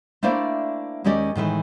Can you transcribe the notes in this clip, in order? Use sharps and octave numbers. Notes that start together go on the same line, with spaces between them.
A3 A#3 D4 E4 C5 D5
D#2 G#3 C#4 G4 D5 D#5
A2 D#3 E3 G#3